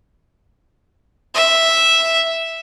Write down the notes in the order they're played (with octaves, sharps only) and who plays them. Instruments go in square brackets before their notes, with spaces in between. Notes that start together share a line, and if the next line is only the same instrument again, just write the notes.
[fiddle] E5